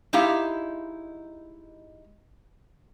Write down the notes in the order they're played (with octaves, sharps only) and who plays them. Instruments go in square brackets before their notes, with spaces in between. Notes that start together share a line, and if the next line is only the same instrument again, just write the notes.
[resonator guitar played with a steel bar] G#3 D#4 E4 G4 F5